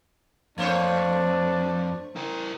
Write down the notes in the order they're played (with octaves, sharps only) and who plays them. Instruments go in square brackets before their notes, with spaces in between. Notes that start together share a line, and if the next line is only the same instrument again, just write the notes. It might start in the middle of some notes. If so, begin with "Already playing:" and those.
[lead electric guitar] F2 [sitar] A3 C5 C#5 [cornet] D4
[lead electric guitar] E4 A#4